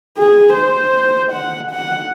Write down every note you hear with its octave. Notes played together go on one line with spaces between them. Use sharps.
G#4
C5
F#5
F#5